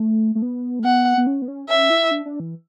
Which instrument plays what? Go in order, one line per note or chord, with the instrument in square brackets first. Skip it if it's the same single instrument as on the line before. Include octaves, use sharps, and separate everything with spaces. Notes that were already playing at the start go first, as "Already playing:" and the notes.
Already playing: [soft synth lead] A3
A3
B3
A3
[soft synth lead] B3 [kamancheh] F#5
[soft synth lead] B3
C#4
B3
C#4
[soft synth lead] C#4 [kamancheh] E5
[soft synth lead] E4
D4
D4
E3